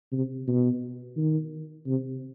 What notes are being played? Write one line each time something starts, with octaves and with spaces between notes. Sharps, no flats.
C3
B2
D#3
C3